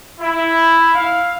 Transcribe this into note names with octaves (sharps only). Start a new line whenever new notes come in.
E4
F5